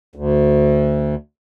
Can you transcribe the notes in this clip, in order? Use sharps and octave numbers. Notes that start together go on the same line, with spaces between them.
D2